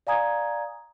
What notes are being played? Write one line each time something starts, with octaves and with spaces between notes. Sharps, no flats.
D5 F5 G#5 A#5 D#6 G#6